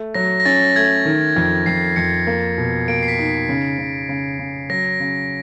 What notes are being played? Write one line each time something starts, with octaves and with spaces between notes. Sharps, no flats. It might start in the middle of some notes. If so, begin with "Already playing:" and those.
Already playing: A3
F#3 A#6
A#6
C#4 A6
A3 G#6
D#3
F2
F2 C7
F2 C#7
A#3
B2
A#3 D7
C7
B6
D#4
B6
C#3
C#3
C#3
C#3
F#3 A#6
C#3